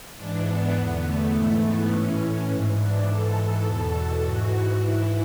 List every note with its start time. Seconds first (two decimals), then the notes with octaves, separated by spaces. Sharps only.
0.15 G#2 E3 D4
0.44 B3
0.74 E2 D3
1.02 A3
1.31 G#2 E3
1.60 B3
1.89 A2 E3 C#4
2.47 G#2 E3
2.76 D4
3.05 G#2 E3 A4
3.35 A4
3.62 E2 B2 A4
4.21 G#2 E3 F#4
4.79 G#2 E3 E4